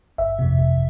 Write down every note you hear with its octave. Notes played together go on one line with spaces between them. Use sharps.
G1 E5
F2 C3
G1